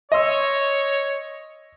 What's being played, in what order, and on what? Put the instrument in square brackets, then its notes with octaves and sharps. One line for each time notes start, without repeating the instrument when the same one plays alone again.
[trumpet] C#5 [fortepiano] D#5 C6 E6